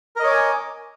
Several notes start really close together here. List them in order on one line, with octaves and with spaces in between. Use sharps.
A#4 D#5 C#5 D6 G#5